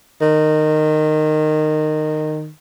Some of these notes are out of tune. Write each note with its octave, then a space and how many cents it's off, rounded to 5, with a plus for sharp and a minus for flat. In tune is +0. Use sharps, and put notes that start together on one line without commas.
D#3 -15